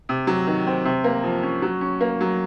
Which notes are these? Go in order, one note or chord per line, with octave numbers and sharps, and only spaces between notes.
C3
F#3
D#3
C4
C3
A#3
F3
C#4
F#3
C#4
A#3
F#3